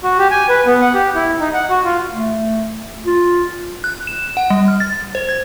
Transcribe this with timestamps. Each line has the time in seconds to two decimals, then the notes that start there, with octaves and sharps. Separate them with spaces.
0.03 F#4
0.18 G4
0.31 G#5
0.49 B4
0.66 B3
0.81 F#5
0.94 G4
1.15 E4
1.40 D#4
1.54 F#5
1.70 F#4
1.84 F4
2.12 A3
3.06 F4
3.84 F#6
4.07 E7
4.37 F#5
4.50 G3
4.68 F6
4.80 A6
5.15 C5
5.29 G#6